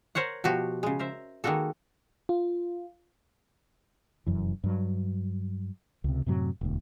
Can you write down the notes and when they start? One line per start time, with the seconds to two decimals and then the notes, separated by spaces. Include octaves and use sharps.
0.15 A#4 C5 C#5 F#5
0.44 B2 F3 F#4 G4
0.83 C#3 G#3
0.99 A#4 C5 E5
1.44 D#3 G#3 A#3 F#4 A4
2.29 F4
4.27 F1 F#2 E3
4.64 G2 F#3
6.04 C#2 C3
6.26 F#2 A2 C3 F#3
6.61 E1 D2